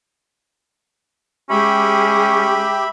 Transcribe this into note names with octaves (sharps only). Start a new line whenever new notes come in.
G#3 C#4 G4 G#4 E5 B5